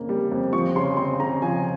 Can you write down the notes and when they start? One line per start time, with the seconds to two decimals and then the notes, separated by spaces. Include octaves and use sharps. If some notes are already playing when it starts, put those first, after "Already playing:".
Already playing: F2 C#3 A#3
0.09 G3
0.31 F2
0.53 F3 C#6
0.76 C#3 C6
0.97 C4 C6
1.20 C#3 A#5
1.42 F3 G#5
1.59 G#5